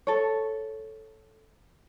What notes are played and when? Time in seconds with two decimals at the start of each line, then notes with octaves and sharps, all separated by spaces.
0.07 A4 C#5